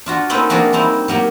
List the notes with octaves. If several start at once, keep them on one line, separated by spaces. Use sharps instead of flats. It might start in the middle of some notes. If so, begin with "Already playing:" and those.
D4 F4 F#4
A#3 C4 C#4 D#4 A4 B4
C3 F3 A#3 D4 F#4 G#4
G3 A#3 C4 D#4 E4
F#3 A#3 G4